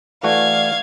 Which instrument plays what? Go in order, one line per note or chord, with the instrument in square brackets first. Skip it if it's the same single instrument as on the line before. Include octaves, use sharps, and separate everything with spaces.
[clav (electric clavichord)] E3 A3 F#4 [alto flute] D5 [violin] F5 G#6